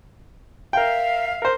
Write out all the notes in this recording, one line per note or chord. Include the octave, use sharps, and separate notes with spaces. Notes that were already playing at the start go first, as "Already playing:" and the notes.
A#4 E5 F5 G5
A#4 C5